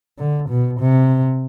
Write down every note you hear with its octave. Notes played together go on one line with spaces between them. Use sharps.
D3
B2
C3